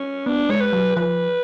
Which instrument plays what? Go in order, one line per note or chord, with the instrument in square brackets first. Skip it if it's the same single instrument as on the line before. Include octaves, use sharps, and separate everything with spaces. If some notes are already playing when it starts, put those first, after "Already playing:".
Already playing: [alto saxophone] C#4
[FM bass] B3 [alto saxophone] D4
[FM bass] G#3 [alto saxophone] C#5
[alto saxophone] B4
[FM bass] F#3
[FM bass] F3 [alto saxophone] B4